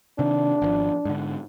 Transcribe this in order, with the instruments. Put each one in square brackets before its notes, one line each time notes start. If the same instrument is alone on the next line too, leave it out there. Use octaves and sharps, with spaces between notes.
[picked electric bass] C3 D#3 [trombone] D4
[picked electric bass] G#1 D#3 F3
G#2 D3